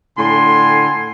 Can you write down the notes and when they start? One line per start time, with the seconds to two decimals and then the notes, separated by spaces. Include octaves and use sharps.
0.18 A2 D3 G#5 C6